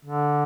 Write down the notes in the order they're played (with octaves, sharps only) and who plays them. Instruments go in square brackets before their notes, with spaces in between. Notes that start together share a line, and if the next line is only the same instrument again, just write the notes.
[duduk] D3